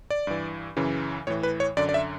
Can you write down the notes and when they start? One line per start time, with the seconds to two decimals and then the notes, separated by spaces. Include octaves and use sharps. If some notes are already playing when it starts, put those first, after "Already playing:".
0.10 D5
0.27 G2 E3
0.77 F#2 C#3 E3
1.27 A2 E3 C#5
1.43 B4
1.60 C#5
1.77 F#2 D3 D5
1.89 D5
1.94 E5